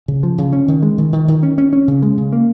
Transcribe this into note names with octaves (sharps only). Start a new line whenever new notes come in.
C#3
F3
C#3
C#4
D#3
G#3
D#3
D#3
D#3
C#4
C#4
C#4
C#3
G#3
C#3
A#3